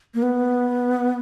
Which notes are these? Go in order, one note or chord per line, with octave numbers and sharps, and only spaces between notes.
A#3
B3